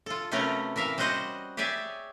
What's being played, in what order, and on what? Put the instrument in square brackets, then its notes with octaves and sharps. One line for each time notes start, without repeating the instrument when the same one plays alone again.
[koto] F4 A4
C3 F#3 A3 B3 C#4 A#4
E3 A#4 E5 F5
G3 C#4 F#4 C5 D#5 F#5
G4 G#4 C#5 D5 E5 G#5